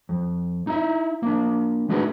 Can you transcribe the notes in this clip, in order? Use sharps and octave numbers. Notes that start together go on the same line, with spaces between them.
F2
D#4 E4 E5
A#3 D4
A3 D4 D#4 F#4 G#4 B4